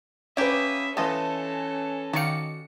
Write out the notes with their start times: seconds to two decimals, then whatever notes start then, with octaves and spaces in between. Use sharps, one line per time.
0.37 A#3 C#4 G4 B4 E5 D#6
0.97 E3 A3 C#4 F4 A4 D#5 A5
2.13 D#3 F#4 D5 F5 C#7